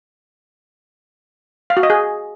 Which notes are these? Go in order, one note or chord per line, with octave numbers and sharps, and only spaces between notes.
F5
F#4
D#5
G#4